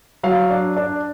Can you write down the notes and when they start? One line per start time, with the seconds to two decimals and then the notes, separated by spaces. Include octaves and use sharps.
0.23 F#3 F5
0.50 D4
0.76 D4